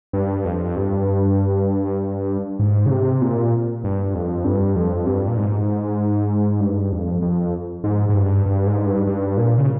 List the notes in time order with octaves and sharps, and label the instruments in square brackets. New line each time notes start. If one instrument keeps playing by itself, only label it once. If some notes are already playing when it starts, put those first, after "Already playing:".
[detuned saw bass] G2
F2
G2
G#2
C#3
C3
A#2
G2
F2
G2
F2
G2
A#2
G#2
G2
F2
F2
G#2
G#2
G2
G2
G#2
G2
G2
A#2
C#3